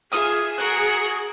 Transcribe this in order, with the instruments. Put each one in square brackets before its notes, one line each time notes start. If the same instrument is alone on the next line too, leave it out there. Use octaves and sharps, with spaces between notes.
[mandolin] F4 D#6 F6 [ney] G#4 [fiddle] E5
[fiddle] F#4 A#4 [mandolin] F#6